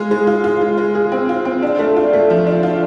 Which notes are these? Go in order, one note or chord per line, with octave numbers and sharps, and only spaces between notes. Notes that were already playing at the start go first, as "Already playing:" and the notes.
Already playing: G#3 F4 G#4
G#3
F4
F4
G#3
G#3
G#4
C4
F4
C4
D4
A3
F4
A3
F3
D4
F4